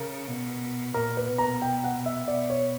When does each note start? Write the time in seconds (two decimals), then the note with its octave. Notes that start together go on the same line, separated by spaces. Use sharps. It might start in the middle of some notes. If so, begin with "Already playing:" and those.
Already playing: C#3 A#4
0.28 B2
0.94 A#2 A#4
1.17 B4
1.28 B2
1.38 A#5
1.62 G5
1.84 F#5
2.06 E5
2.28 B2 D5
2.50 C#5